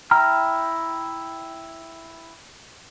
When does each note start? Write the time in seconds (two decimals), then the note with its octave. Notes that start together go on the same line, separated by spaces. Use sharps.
0.11 E4 G5 A#5 F6